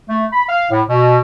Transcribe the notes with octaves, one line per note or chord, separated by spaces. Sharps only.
A3
B5
F5
A2
B2